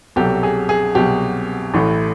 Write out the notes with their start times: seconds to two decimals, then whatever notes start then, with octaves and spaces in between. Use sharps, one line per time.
0.16 C2 B2 F#3 G4 A4
0.43 G#4
0.69 G#4
0.95 C2 B2 F#3 G4
1.74 A1 A2 E3 A3